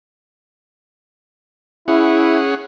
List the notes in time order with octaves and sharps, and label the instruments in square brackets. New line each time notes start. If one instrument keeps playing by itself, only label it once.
[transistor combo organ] C#4 G#4 F#5 [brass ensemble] E4